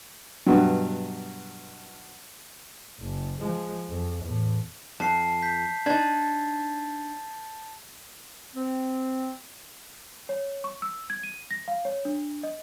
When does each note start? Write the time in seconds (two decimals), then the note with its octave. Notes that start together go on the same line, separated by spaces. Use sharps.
0.46 G2 B2 F#3
3.00 F#1
3.40 F3 G#3
3.89 F2
4.23 E2 A2
5.00 F2 A5 C7
5.42 G6 B6
5.86 D4 D#4 A5 G#6 A6
8.55 C4
10.29 C#5
10.64 C#6
10.82 E6
11.10 G#6
11.23 D#7
11.51 A#6
11.68 F5
11.85 C#5
12.05 D4
12.43 D#5